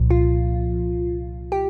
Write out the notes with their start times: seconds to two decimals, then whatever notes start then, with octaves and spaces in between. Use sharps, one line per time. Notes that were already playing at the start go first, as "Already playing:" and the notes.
Already playing: C2 A#2 F3
0.10 F4
1.52 G4